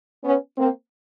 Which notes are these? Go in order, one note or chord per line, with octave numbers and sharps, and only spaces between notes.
B3 C#4
A#3 C4